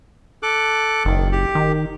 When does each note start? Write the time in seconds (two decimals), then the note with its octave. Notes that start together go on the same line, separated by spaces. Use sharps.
0.43 A4 D6 F#6
1.05 F#1 D#3
1.32 G4
1.55 D#3